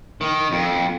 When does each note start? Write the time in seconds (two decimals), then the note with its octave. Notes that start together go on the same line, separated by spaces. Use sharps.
0.21 D#3
0.52 F2